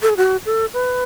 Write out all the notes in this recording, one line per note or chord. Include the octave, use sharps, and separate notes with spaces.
A4
G#4
F#4
A4
B4